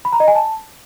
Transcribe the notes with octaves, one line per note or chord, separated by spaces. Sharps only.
B5
A#5
D#5
G#5
A5